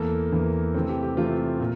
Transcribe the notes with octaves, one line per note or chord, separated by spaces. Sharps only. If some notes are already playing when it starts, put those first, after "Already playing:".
Already playing: E2 E3 A#3 A4
E2 E3 A#3
C3 E3 A3 C4
G4
G4
C3 E3 A3 C4 F4
A#2